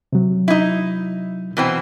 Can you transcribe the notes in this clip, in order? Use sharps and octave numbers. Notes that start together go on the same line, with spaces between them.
C3 F#3
D#4 E4
B2 E3 C4